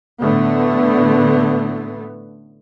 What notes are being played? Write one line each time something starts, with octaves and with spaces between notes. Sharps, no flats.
A1 A2 D3 A3 B3